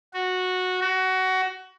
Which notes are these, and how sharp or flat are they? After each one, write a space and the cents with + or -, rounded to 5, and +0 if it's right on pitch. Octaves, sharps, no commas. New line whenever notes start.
F#4 -10
F#4 +20